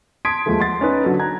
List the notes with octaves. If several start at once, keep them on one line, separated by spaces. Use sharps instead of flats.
A5 C6 D#6 G#6 B6 D7
D#2 F3 G#3 A3
F#5 C6 A6
C#4 D#4 B4
D3 F#3 A4
A#5 F#6 G#6